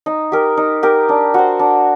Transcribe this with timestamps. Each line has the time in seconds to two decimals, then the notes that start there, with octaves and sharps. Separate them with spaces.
0.06 D#4
0.32 G4 A#4
0.57 D#4
0.83 G4 A#4
1.09 D4
1.34 F#4 C5
1.59 D4